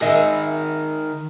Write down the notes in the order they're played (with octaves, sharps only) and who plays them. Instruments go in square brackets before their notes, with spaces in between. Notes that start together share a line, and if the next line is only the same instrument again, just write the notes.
[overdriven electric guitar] D#3 G#4 [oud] A#4 D#5 E5